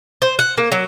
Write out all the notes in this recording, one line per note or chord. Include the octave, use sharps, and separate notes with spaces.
C5
F#5
A#3
F#3